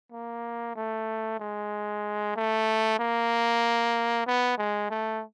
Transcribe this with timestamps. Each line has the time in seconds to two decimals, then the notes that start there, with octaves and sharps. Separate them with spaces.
0.12 A#3
0.76 A3
1.40 G#3
2.36 A3
2.99 A#3
4.26 B3
4.58 G#3
4.91 A3